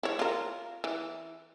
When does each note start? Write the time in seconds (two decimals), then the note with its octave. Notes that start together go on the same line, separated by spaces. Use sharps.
0.03 E4 C#5
0.19 F4 A#4
0.84 E3